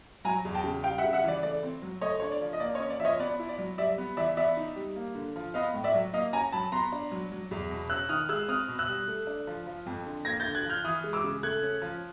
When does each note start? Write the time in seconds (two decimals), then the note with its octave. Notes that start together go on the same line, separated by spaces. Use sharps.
0.25 F#3 G#5 A#5
0.45 E2
0.55 G5 A5
0.64 C#3
0.84 G3 F5 G5
0.98 E5 F#5
1.04 C#3
1.13 E5 F#5
1.24 E3 D5
1.43 A3 D5
1.63 C4
1.82 F#3
2.01 A3 C#5 D#5
2.20 D4 C#5
2.32 D5
2.41 F3
2.53 D#5
2.60 A#3 D5
2.75 C#5 D#5
2.80 C#4
2.90 D5
3.00 F3 E5
3.05 C#5 D#5
3.19 B3 D5
3.39 E4
3.49 D5
3.58 F#3
3.78 G3 D5 E5
3.98 B3
4.17 E3 D5 E5
4.37 B3 D5 E5
4.57 D#4
4.76 G3
4.96 A#3
5.15 D3
5.36 F3
5.54 B3 D#5 F5
5.74 A2
5.84 D5 E5
5.95 F#3
6.14 A#3 D#5 F5
6.33 C#4 G#5 A#5
6.52 F#3 A5 B5
6.72 B3 A#5 C6
6.92 D4
7.12 F#3
7.32 F#3
7.51 E2
7.71 B2
7.90 C#4 E6 F#6
8.09 D#3 D#6 F6
8.29 G#3 E6 F#6
8.48 C4 D#6 F6
8.68 B2
8.79 E6 F#6
8.88 G3
9.08 A3
9.27 D4
9.47 F3
9.67 F3
9.86 F2
10.06 D3
10.25 A#3 G#6 A#6
10.40 G6 A6
10.45 D3
10.55 F#6 G#6
10.64 F3
10.69 F6 G6
10.84 E3 D#6 F6
11.04 G#3
11.13 D6 E6
11.24 C#3
11.43 A3 F#6 G#6
11.63 C#4
11.82 F3